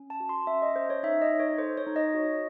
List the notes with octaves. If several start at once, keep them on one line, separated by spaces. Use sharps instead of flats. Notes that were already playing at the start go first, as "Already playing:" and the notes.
Already playing: C#4
A5
F#4
C6
C#4 E5
D#5
C#4 C5
C#5
D#4 E5
D#5
D#4
C#5
A4 C5
C#5
D#4
D#5
F#4